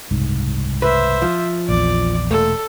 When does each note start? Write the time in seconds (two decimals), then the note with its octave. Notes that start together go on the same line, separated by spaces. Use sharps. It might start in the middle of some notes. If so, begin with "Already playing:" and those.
0.11 F#1 C2 G#2
0.82 B4 C5 E5
1.22 F3
1.69 A#1 E2 D5
2.31 E1 A#2 A3 A4